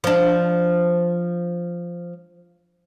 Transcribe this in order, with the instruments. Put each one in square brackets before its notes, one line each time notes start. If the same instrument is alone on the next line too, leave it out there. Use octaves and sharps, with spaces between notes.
[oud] F3 D4